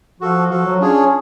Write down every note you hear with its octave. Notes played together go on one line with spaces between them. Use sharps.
F3 F#4 A4 F5
F3 F#4 A4 F5
F#3
C#4 D4 F4 G#4 C#5